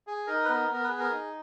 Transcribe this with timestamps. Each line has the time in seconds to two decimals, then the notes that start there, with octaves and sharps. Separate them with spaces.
0.07 G#4
0.27 D#4 A#4
0.44 B4
0.49 B3 A#4
0.68 B3 A#4
0.84 B4
0.89 G#4
0.99 A#4
1.10 D#4